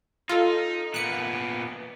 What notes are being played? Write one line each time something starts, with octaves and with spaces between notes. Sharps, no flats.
D#4 F4 A4
A#2 B3 F#6 C#7